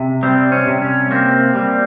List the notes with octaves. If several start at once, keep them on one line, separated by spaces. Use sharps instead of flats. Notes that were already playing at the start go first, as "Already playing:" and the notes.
Already playing: C3
G3 C4
C#4
C3
C#4
A#3 C4
G3